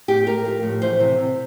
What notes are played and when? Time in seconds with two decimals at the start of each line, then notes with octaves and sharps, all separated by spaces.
0.08 A2 G4
0.26 A3 A#4
0.45 F3
0.63 A2
0.82 E3 C5
1.00 C3
1.18 C3